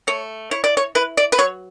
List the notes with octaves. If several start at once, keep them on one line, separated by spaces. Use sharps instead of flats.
A3 C#5
E4 C#5
D5
C#5
E4 B4
D5
B4
F#3 C#5